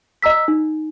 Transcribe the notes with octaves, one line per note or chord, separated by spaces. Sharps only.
D#5 A#5 E6 B6
D#4